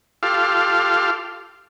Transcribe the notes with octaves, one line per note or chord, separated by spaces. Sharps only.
F4 G4 A4 F5